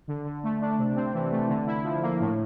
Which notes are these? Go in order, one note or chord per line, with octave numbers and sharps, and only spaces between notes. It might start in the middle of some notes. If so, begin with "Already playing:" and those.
D3
D3
A3
D4
C3
C4
E3
A3
D3
E4
F3
A#3
A2